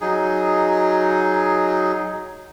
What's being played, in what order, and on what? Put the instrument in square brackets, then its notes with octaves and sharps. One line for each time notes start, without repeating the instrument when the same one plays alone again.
[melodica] F#3 D#4 G#4